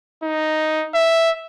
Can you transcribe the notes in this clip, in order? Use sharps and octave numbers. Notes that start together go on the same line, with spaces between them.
D#4
E5